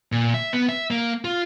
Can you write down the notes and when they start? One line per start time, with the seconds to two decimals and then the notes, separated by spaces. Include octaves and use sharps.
0.12 A#2
0.34 E5
0.53 B3
0.69 E5
0.91 A#3
1.25 F4